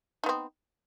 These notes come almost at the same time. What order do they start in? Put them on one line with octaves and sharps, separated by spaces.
D#4 B3 C4